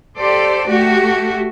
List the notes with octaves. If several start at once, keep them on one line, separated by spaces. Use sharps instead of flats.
G4 A4 C5 D5
A3 F#4 G4